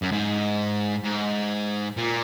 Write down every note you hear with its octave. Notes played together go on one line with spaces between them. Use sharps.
F#2
G#2
G#2
A#2